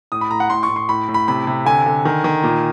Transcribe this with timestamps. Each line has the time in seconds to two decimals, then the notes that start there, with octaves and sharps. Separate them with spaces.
0.12 A2 D#6
0.21 B5
0.31 A2 A#5
0.40 F#5
0.50 A2 C6
0.63 C#6
0.69 A2
0.76 C6
0.89 A2 B5
1.08 A2
1.14 B5
1.28 C3 B5
1.47 C3
1.66 D3 G#5
1.86 D3
2.05 D#3
2.24 D#3
2.43 A#2